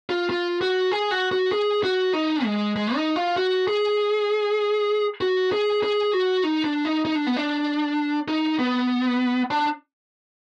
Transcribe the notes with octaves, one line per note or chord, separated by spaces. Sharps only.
F4
F4
F#4
G#4
F#4
F#4
G#4
F#4
D#4
G#3
G#3
D#4
F4
F#4
G#4
F#4
G#4
G#4
F#4
D#4
D4
D#4
D#4
D4
B3
D4
D#4
B3
D4